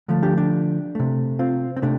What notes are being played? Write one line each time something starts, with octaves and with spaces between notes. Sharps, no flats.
D3 F3 A3
D4 G4
D4
C3 A3
C4 F4
C4
C3 A3 D4